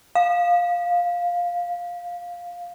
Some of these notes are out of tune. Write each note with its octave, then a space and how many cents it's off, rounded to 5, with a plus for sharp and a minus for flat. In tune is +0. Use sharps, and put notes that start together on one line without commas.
F5 +10